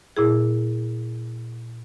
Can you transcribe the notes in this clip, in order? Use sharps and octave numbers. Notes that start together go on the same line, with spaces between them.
A#2 E4 G#4